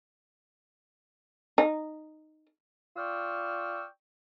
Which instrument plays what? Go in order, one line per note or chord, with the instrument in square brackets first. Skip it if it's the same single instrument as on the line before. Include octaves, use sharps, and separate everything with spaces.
[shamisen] D#4
[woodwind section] F4 D5 G5 C#6 E6 F6